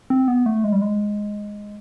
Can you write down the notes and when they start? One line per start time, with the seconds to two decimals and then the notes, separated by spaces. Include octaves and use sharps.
0.10 C4
0.28 B3
0.46 A3
0.64 G#3
0.72 G3
0.82 G#3